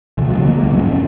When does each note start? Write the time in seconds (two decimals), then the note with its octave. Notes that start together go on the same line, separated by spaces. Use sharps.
0.18 D2 C3 E3
0.31 C#3 F3 F#3
0.45 D3 A#3
0.59 C#2 G3 A#3
0.72 G#2 E3 F#3 C#4
0.85 F1 E2 C#4